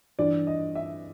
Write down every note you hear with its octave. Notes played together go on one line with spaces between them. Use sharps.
G2 E3 D5
D#5
E5